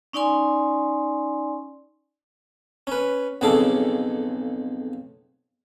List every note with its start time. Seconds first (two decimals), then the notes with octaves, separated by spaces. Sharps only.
0.13 C#4 D#4 D5 G#5 C6
2.87 C#4 B4
3.41 B1 F2 C#3 G#4 A4 D6